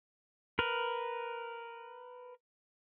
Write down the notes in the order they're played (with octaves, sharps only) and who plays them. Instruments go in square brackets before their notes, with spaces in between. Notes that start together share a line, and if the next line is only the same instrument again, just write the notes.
[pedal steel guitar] A#4 B4